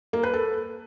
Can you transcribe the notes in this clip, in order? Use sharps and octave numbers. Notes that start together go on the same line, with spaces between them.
A#3
B4
A4